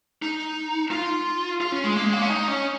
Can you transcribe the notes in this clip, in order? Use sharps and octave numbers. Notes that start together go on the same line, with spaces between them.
D#4
F4
F4
C#4
G#3
A#3
G#3
A#3
C#4
D#4
C#4